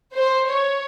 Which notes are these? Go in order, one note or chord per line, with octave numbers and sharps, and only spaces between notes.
C5
C#5